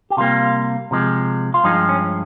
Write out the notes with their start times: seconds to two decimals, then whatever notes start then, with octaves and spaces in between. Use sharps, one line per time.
0.10 G4
0.17 C3 G3 A#3 F4
0.91 C3 F3 G#3
1.54 F4
1.64 G2 F3 G#3 D#4
1.89 C#4